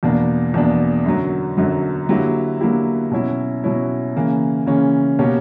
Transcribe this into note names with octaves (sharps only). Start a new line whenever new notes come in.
E2 B2 A#3 D4
E2 B2 A#3 D4
F#2 D3 F#3
F#2 D3 F#3
D3 F#3 A#3 E4 G4
D3 F#3 A#3 E4 G4
B2 F#3 C#4 E4
B2 F#3 C#4 E4
C#3 E3 A#3 C#4
C#3 E3 A#3 C#4
B2 A#3 C#4 G4